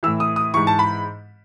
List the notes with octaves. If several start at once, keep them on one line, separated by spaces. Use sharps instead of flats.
A2 E3 E6
D#6
D#6
G#2 E3 C#6
A5
B5